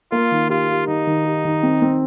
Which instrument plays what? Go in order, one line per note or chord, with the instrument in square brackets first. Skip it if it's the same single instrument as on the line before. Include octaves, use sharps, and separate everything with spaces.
[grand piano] A#3 [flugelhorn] F4
[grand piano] D#3
[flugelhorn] F4 [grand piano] G4
[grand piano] G4
[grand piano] D#3 [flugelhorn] D#4
[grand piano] D#3
G4
D#3
C4
C4